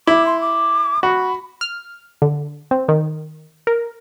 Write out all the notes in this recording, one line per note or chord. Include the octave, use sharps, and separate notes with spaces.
E4 D6
C6
D6
F#4 B5
F6
D3
C4
D#3
A#4